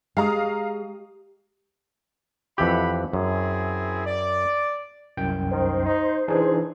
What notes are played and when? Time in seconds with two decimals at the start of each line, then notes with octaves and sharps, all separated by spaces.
0.17 G#3 G4 F5 A#5 D#6
2.58 F2 E3 G4 E5 F#5 B5
3.13 F#2 C4 E4 G#4
4.06 D5
5.17 C2 F#2 G5
5.51 D#3 C5
5.85 D#4
6.28 E3 D4 D#4 G#4